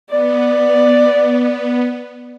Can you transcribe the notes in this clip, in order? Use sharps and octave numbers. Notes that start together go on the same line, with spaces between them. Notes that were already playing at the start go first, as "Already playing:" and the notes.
B3 D5